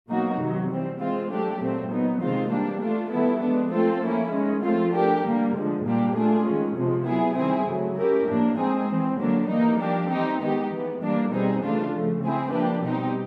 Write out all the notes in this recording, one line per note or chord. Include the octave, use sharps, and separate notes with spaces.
B2 F#3 A#3 D#4 F#4
C3 D#3 F#3
E3 G3 C4
G#3 C4 F4
F#3 A3 D4 G4
A#2 F#3 A3 C4
F#3 B3 D#4
C3 D#3 G#3 C4 F4
E3 G3 A#3 D4
A3 D4 F4
D#3 G3 B3 E4 A4
F3 G#3 B3 D4
A3 C4 F4 A4
F3 A#3 C#4 E4
D#3 G#3 C#4
F3 A3 C4 F4
A3 D4 G4 A#4
D3 G3 A#3
D3 F3 G#3
A#2 G3 A#3 D4 G4
A3 D4 F4 G#4
D#3 G#3 C#4
C3 F3 G#3
F#3 B3 E4 G#4
D#3 G3 C4 E4 G#4
C#3 F#3 A3
A3 C#4 E4 G4 A#4
A2 F3 A#3 D4
G#3 C4 D#4 G#4
E3 G#3 C4
D3 F#3 A#3 D4
E3 G3 A#3 D#4
F3 A#3 D4 G4
E3 G3 C4 D#4 G4
D#3 G#3 B3 D#4 G4
E3 G#3 B3
E3 G3 A#3 D4
B2 G3 C4 D#4 G#4
C#3 E3 A3 D4 F4
C#3 F3 A3
G#3 C4 E4 G#4
F3 A#3 D4 G4 B4
B2 G3 C4 D#4 G4